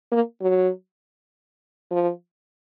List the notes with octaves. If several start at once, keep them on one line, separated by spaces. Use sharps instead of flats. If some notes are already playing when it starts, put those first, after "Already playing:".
A#3
F#3
F3